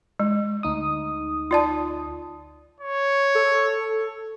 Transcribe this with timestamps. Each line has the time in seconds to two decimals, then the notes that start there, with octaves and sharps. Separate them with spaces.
0.19 G#3
0.63 D2 D#4 D#6
1.51 F4 D5 A5
2.80 C#5
3.35 A4